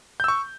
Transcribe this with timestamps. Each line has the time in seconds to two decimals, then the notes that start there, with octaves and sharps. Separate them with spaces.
0.20 G6
0.24 E6
0.28 C#6